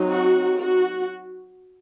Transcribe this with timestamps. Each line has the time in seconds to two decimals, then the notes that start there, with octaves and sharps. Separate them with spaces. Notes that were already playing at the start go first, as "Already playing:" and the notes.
Already playing: F#3 C4 D#4
0.09 F#4
0.60 F#4